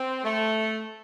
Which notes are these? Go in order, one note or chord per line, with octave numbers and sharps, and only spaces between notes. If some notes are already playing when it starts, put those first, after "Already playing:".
Already playing: C4
A3